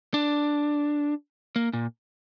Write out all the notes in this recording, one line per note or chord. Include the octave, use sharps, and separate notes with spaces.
D4
A#3
A#2